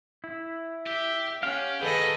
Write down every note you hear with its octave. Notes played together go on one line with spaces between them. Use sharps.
E4
G4 E5
C#4 G4 F5 F#5
D#3 F#3 G#4 A4 B4 D#5